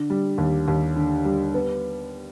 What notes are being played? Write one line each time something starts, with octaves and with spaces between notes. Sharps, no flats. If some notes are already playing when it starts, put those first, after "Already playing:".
Already playing: D3
G3
D#2
D#2
D3
G3
B3